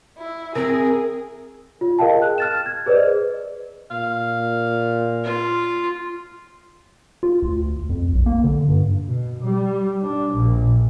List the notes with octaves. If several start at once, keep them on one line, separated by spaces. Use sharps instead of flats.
E4
C4 G#4 A#4
F4
G#4 A#4 D#5 F5 G5 A5
F#6
F6 A6 E7
G#6
G#4 B4 C5 D5 D#5
A#2 F5
F4
F4
D2
F2
B1
A#3
D3
G2
B2
G3
D4
A#1